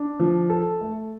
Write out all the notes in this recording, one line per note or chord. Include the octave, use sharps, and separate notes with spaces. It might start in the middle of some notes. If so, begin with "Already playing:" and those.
Already playing: D4
F3
A4
A3